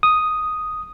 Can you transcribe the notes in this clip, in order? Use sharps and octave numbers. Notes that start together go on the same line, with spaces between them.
D#6